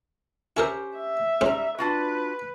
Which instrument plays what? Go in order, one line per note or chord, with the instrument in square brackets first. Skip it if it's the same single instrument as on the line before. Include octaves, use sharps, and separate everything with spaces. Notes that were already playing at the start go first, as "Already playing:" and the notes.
[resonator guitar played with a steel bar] C#4 G4 C5 [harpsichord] E4 A4 A#4
[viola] E5
[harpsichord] G#2 C#4 C5 [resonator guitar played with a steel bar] G3 A#5
[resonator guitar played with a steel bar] D4 F4 F#4 [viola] B4